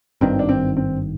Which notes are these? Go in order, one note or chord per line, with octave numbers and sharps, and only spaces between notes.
G#1 G2 D#3 C4
D4
C4
C4